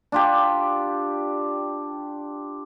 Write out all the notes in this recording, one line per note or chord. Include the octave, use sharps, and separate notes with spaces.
D4 F4 G4